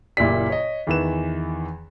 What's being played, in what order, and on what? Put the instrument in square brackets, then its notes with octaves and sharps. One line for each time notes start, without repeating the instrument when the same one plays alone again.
[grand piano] F#1 A#2 E4 G4 D5 B6
C#5 D#5
E2 D#3 E3 B4 E7